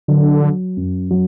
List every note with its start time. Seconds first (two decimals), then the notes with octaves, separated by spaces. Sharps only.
0.08 D3 F#3
0.42 F#3
0.77 F#2
1.11 F#3